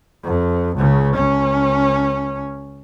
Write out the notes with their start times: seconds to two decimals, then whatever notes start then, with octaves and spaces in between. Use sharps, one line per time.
0.24 F2
0.76 C#2 C#3
1.16 C#2 C#4